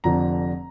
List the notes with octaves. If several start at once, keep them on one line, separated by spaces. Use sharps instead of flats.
F1 F2 D3 F3 A#5